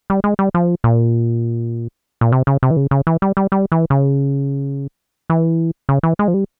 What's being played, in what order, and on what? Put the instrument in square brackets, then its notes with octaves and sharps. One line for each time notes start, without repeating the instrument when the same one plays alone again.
[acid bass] G3
G#3
G3
F3
A#2
A#2
C3
C#3
C3
E3
C#3
C#3
E3
G3
G3
G3
E3
C#3
E3
C#3
E3
G#3
F3
G3